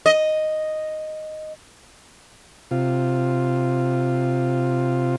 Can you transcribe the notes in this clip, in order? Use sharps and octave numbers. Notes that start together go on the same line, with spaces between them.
D#5
C3 F4